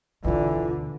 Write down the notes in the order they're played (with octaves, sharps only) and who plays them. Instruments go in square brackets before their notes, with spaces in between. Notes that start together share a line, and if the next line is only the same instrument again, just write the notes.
[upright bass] D2 B2 [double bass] D3 [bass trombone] E3 [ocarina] F4